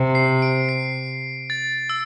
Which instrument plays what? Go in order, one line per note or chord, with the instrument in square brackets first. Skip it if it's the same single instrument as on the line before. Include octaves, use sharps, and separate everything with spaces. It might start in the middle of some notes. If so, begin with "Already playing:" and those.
Already playing: [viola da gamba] C3
[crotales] C7
D7
C7
A6
E6